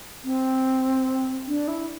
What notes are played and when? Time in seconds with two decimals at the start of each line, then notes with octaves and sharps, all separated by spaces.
0.24 C4
1.47 D4
1.67 E4